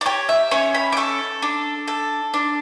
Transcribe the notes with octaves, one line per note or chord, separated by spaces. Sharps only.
D5
G4 C#5
E5
C#4 C#5
B5
D6
A4 C#6
D4
A4
D4